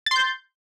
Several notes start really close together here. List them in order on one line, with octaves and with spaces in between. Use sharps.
A6 C6 G6